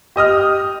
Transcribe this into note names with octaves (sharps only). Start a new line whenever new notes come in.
G4 D#5 D#6 F6